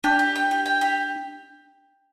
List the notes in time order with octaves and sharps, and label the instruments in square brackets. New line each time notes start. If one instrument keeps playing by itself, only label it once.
[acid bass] D4 [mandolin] G4
[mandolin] G4
G5
G4
G5
G4